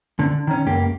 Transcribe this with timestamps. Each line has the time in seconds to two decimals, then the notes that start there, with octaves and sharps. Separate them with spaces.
0.19 D3
0.47 D#3 C#4
0.66 C#2 F#2 A#3 G4